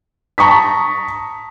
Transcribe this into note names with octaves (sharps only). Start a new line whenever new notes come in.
A5 A#5 C#6 D#6 B6